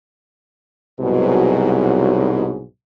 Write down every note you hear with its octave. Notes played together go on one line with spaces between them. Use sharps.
C2 G#2 B2 F#3